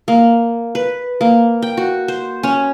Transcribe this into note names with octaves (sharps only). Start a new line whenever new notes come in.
A#3
B4
A#3
G5
F#4
C5
C#4